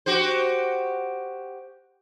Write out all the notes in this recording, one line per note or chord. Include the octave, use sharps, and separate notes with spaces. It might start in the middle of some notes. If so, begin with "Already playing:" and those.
F#4 G4 C5